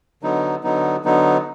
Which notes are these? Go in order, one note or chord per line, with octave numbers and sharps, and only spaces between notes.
D3 F#3 B3 D#4
D3 F#3 B3 D#4
D3 F#3 B3 D#4